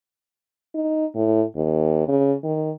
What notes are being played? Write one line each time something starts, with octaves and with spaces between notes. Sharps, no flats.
D#4
A2
D#2
C#3
D#3